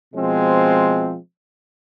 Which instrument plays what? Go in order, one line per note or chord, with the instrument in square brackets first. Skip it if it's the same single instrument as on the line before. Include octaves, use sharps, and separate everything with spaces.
[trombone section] B2 F3 G#3 C4